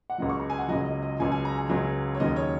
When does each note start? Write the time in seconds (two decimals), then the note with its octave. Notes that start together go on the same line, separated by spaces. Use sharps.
0.10 F#5
0.18 C#2 C#3 F#3 D#5
0.29 C#6
0.40 A#5
0.50 G#5
0.58 F#5
0.68 C#2 C#3 F#3 D#5
0.86 D#5
1.03 D#5
1.20 C#2 C#3 F#3 G#5
1.32 G#5
1.45 A#5
1.58 G#5
1.70 C#2 C#3 F#3
2.15 C#5
2.20 D#2 C#3 F#3 D#5
2.36 C#5